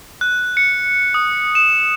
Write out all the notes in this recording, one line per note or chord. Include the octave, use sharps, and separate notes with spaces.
F#6
C#7
D#6
E7